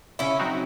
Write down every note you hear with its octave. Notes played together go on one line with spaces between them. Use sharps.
C#3 C#4 E4
F#3 C4 D#4 F#4